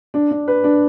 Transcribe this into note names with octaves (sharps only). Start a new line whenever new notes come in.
D4
D4
B4
D4